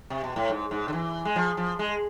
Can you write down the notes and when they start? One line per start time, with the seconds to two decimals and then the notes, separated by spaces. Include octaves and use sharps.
0.10 C3
0.24 B2
0.36 A2
0.50 G#2
0.71 G#2
0.88 D3
0.93 E3
1.25 G#3
1.36 F3
1.57 F3
1.79 G#3